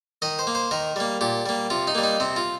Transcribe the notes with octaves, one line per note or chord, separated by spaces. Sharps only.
D#3 D#5
C5
A#3
C5
D#3 A#4
G3 A#3
A#2 G4
G3 A#3
C3 F4
D#4
G3 A#3
D#4
C3 C4
F4